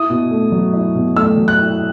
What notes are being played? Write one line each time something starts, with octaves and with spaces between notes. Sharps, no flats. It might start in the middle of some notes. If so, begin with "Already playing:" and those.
Already playing: E4 D#6
B2
A3
F#3
E4
B2
A3 E6
F#3
F#6
E4